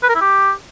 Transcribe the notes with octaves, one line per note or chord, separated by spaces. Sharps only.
B4
A#4
E4
G4